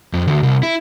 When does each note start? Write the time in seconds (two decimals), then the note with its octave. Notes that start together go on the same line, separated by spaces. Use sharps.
0.13 F2
0.28 D2
0.43 C2
0.63 E4